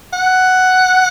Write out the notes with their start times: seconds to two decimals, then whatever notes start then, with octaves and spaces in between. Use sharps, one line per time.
0.13 F#5